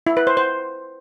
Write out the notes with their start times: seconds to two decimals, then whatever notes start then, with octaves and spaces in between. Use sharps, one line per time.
0.07 E4
0.17 B4
0.27 C5
0.37 C5